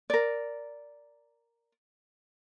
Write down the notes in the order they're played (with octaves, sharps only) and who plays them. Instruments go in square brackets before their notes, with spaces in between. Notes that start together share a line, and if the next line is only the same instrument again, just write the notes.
[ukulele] A#4 D5